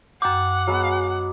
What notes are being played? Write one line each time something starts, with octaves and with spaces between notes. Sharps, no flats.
F#2 F#5 G5 D6 G6
F#3 G#3 B3